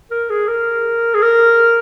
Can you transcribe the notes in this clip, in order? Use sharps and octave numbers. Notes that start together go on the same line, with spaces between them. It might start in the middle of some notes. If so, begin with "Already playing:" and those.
A#4
G#4
A#4
G#4
A#4